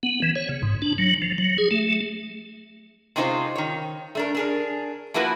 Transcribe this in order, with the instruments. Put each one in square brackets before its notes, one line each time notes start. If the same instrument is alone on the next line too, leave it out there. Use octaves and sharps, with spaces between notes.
[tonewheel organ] B3
E3
C#5
C#3
G#2
D4
F#3
F3
F#3
G#4
A3
[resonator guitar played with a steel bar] C3 G#3 C#4 D#4 F4 C5
D#3 C#5
A3 D4 A#4
D4 G#4 A#4
F3 A#3 B3 E4 F#4 B4